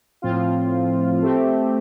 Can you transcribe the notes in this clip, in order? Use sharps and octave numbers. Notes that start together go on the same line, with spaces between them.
A2 F3 C4 F4
A3 C4 G4